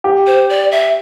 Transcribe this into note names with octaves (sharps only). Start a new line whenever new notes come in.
G4
C5
D5
E5